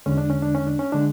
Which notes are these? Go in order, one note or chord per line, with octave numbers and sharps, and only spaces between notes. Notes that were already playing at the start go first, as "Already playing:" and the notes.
E2 D3 G#3 C#4
D4
C#4
D4
C#4
D4
C#4
D3 G#3 D4